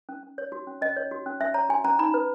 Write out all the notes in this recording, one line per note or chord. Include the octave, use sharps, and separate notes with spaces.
C#4
C#4
C#5
F#4
C#4
C#4 D#5
C#5
F#4
C#4
C#4 E5
C#5 A#5
F#4 G#5
C#4 A#5
D#4 B5
B4